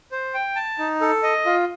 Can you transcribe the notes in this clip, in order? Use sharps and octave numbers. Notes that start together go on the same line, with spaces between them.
C5
G5
A5
D#4
A4
D#5
F4